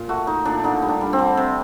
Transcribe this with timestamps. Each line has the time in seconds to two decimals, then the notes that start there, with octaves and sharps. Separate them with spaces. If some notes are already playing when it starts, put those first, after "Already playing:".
Already playing: A#2
0.09 A3 F#4
0.27 A3 D#4
0.45 A#2 D4
0.64 D3 D#4
0.82 G3
0.89 D4
1.01 G3
1.13 C4
1.19 D3
1.37 C3